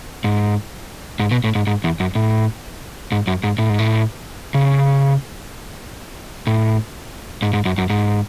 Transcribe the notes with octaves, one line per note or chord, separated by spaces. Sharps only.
G#2
G#2
B2
A2
G#2
G#2
E2
F#2
A2
G#2
F#2
G#2
A2
G#2
A2
C#3
A2
G#2
G#2
F#2
F#2
G#2